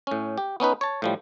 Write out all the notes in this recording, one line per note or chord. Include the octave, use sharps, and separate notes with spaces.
A2 C#4
G4
B3 C#4 D#4 B4
C#5 A5
A2 F3 G3